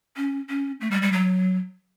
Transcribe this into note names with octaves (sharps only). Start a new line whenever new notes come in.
C#4
C#4
A3
G3
G3
F#3